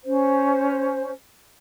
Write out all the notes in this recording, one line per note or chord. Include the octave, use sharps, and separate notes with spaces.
C#4 C5